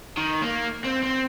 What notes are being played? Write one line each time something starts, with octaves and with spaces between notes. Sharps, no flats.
D#3
A#3
C4
C4